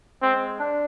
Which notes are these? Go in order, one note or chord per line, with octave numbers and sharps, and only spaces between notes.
G#3 C4
D4